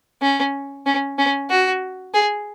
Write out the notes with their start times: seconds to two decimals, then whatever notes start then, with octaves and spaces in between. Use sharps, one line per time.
0.22 C#4
0.86 C#4
1.18 C#4
1.50 F#4
2.14 G#4